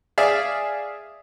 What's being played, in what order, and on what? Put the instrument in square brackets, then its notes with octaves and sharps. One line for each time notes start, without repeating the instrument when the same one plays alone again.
[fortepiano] G#4 D5 E5 F5